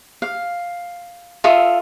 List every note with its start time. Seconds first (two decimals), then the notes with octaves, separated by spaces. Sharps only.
0.22 F5
1.44 F4 A4 E5 D#6